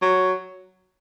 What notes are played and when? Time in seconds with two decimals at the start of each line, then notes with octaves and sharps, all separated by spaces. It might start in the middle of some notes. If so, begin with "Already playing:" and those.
0.02 F#3